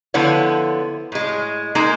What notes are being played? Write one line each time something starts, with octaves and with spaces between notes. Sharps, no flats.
D3 F3 B3 E4 C#5
A2 G#3
G#3 A#3 D#4